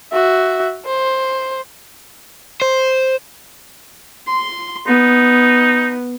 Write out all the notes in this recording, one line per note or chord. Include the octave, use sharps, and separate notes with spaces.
F#4 E5
C5
C5
C6
B3 D#4